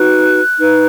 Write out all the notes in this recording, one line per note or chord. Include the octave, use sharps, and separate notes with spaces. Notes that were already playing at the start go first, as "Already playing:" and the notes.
Already playing: D#4 F#4 B4 F#6
D#4 B4